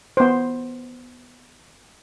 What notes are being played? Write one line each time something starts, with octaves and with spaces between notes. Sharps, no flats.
B3 C5